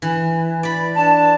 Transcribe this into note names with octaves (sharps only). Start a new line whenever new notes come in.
E3
D5 B5
D4 A5